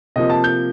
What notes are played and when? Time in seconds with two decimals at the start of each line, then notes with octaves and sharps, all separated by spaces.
0.16 C3 F3 A#3 D#5
0.30 A5
0.44 G6